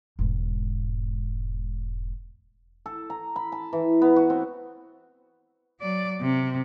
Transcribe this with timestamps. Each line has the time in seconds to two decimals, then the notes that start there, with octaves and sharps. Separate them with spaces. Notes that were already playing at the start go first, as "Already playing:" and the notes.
0.19 E1 G#2
2.86 A4
3.10 A#5
3.36 B5
3.52 A5
3.73 E3
4.02 B3
4.16 F#4
4.30 C4
5.81 F#3 D5
6.21 C3